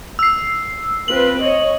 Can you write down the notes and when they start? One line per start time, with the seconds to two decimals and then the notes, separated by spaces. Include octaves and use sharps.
0.19 E6 C7
1.08 C4 F4 B4 F#7
1.43 C#5 D#5